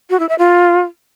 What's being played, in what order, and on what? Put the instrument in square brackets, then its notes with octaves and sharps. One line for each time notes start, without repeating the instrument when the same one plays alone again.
[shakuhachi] F#4
E4
E5
F4